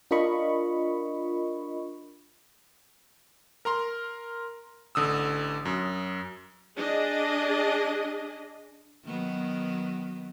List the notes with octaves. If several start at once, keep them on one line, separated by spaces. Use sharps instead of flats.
D4 F4 A#4 D#5 B5 C#6
A#4 A#5 C6
A1 D3 D#6 E6
F#2
D4 G#4 D#5
D#3 F#3 B3